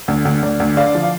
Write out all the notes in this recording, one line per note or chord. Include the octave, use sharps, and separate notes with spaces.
D2
D2
D2 D5
D2
D3 D5 F5
F3
F5